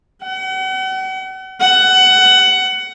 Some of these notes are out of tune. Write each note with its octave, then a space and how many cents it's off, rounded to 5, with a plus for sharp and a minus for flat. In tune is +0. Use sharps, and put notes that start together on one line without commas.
F#5 +40
F#5 +20